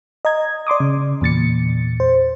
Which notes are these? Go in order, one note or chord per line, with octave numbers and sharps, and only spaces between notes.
D#5 A#5 G#6
D5 C6 D6 D#6
C#3
E2 A#2 A6 C#7
C5